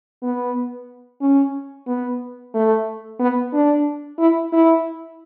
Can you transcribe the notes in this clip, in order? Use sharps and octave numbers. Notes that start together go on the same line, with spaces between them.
B3
C#4
B3
A3
B3
D4
E4
E4